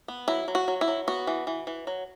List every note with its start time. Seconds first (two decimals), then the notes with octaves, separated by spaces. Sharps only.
0.08 B3
0.28 F#3 E4
0.48 F#3
0.55 F#4
0.68 F#3
0.81 E4
0.88 F#3
1.08 B3 F#4
1.27 E3
1.47 E3
1.67 E3
1.87 F#3